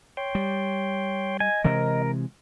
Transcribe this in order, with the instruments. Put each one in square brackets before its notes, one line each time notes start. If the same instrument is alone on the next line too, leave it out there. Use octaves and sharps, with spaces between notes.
[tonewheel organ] C#5 G5 C6
[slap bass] G3
[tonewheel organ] D#5 [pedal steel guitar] G#5
[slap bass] C3 E3 G#3 [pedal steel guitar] A#4